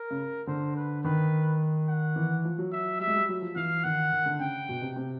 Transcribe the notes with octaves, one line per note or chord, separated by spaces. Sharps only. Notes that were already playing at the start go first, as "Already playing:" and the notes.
Already playing: A#4
C#3
D3 C5
B4
D#3 B4
F#5
E3
F3
F#3
E5
G3 E5
G#3
G3
F#3
F3
E3 F5
D#3 F#5
D#3
D3
C#3 G5
B2
C3
C3